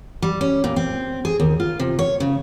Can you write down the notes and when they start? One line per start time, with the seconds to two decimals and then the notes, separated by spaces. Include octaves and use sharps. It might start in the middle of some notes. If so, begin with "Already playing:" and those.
0.22 G3
0.41 C#4
0.64 A#2
0.76 C4
1.25 G#4
1.40 D#2
1.60 F4
1.79 C3
1.99 C#5
2.20 C#3